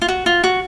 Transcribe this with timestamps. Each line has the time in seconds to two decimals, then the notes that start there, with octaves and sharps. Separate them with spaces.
0.02 F4
0.08 F#4
0.26 F4
0.44 F#4